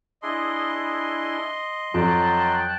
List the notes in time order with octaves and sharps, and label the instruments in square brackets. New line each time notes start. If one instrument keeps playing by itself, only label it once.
[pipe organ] D4 E4 G#4 [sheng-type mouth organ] D#5 C6
[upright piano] F2 [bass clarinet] F#3 [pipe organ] G5 A5 F#6